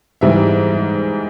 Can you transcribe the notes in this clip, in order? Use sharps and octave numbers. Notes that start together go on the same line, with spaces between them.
G#2 E3 G3 E5